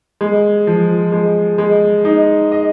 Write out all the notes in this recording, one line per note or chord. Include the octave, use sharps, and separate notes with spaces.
G#3
F3
G#3
G#3
D#4
D#5